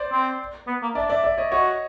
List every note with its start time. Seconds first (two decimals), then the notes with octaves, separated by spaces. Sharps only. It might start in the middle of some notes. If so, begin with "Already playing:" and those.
Already playing: C5 D5
0.12 C4
0.67 B3
0.82 A#3
0.95 D4 D5 E5
1.10 D5 E5
1.24 D5 E5
1.38 C#5 D#5
1.52 F#4 C#5 D#5